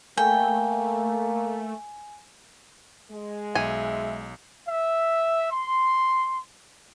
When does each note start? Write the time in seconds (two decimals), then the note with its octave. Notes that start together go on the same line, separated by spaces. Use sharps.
0.17 A3 A#3 G5 G#5
3.11 G#3
3.55 B1 E5 G#5
4.68 E5
5.52 C6